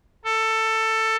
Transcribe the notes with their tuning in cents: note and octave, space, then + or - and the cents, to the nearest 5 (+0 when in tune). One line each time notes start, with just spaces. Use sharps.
A4 +15